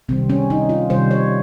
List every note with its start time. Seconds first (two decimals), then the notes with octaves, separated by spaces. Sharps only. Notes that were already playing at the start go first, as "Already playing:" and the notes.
0.09 C3 D#3 G3 C4
0.30 C#4
0.50 D#4
0.69 F4
0.90 C3 D#3 G3 C5
1.11 C#5